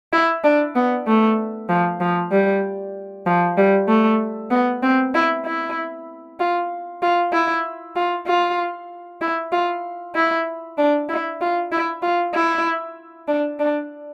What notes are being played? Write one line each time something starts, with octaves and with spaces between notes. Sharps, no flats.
E4
D4
B3
A3
F3
F3
G3
F3
G3
A3
B3
C4
E4
E4
F4
F4
E4
F4
F4
E4
F4
E4
D4
E4
F4
E4
F4
E4
D4
D4